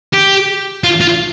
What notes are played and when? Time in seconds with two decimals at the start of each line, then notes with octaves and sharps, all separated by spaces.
0.13 G4
0.84 F4
1.01 F4